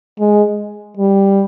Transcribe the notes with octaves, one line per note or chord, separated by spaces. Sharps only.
G#3
G3